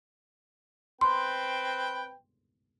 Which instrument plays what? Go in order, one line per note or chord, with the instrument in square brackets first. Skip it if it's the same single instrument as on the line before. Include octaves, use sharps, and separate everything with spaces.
[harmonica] C4 B4 G5 [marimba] C6